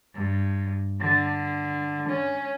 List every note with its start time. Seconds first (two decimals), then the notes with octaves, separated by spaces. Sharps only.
0.15 G2
1.00 D3
2.09 C#4